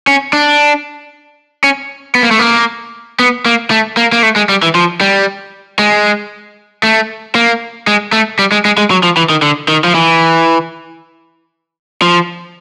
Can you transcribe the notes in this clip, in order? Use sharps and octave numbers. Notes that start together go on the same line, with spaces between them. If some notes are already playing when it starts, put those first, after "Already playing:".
C#4
D4
C#4
B3
A#3
A3
A#3
B3
A#3
A3
A#3
A#3
A3
G#3
G3
E3
F3
G3
G#3
A3
A#3
G#3
A3
G3
G#3
G#3
G#3
F#3
F3
E3
D#3
D3
D#3
F3
E3
F3